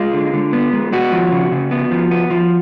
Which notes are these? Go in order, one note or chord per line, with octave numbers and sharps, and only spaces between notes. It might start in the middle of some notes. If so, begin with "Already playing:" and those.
Already playing: G#3 F4
D3
D3
B3
G#3
B3 F#4
F3
C#3
C#3
B3
F3
B3
F3